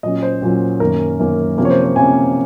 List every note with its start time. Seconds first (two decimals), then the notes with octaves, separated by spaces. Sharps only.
0.03 A#2 F#3 C#4 D#5
0.23 C5
0.42 A#2 F#3 C#4
0.80 F#2 D#3 A#3 C#4 A#4
1.19 F#2 D#3 A#3 C#4
1.58 C3 F3 A#3 C#4
1.65 C#5
1.70 C5
1.84 C5
1.96 C3 F3 A#3 C#4 G#5